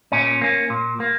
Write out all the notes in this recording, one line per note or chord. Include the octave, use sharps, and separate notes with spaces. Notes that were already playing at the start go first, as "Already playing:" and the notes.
A#2 C#4
A#3 C#4
A#2
A#3